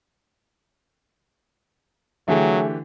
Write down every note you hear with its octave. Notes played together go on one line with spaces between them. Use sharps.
D3 E3 F#3 A3 G4 G#4